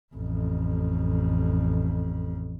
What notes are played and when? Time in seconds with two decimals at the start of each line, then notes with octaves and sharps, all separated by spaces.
0.15 A1 F2